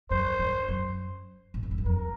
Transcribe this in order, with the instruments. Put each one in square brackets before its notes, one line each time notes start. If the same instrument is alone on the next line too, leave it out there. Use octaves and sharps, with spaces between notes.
[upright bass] F#2 [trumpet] C5
[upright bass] G2
F#2
A2
G#2
G2
F#2
[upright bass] F2 [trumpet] A#4